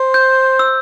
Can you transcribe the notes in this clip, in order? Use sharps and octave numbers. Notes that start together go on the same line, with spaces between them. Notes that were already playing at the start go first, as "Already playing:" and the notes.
Already playing: C5
G6
E6